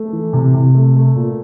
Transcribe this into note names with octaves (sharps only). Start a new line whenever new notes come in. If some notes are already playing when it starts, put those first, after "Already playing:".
Already playing: A3
E3
C3
C3
A3
A3
A#2